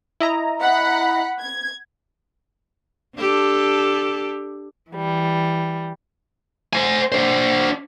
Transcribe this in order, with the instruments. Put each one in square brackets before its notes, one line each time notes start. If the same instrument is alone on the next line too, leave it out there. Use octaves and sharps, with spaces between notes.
[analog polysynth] E4 D#5 A#5
[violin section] F#5 B5
G#6
[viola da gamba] D4 G4 A4
[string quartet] E3 G3
[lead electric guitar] C5 G#5
D4 C5